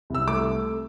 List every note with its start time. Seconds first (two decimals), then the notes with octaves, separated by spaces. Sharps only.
0.10 C2 E6
0.27 A3 D6